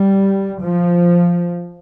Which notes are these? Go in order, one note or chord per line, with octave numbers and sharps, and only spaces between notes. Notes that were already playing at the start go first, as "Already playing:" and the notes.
Already playing: G3
F3